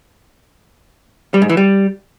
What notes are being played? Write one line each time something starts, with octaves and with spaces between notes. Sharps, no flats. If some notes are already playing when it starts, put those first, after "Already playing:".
G3
G#2
E3
G3